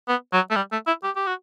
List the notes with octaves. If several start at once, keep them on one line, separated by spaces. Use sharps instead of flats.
B3
F#3
A3
G3
A3
E4
G4
G4
F#4